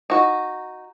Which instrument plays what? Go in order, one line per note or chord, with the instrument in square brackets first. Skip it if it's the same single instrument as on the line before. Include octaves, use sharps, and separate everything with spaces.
[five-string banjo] D#4 F#4